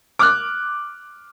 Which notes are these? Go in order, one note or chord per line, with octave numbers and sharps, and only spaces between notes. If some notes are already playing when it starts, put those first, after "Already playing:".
D6 F6 F#6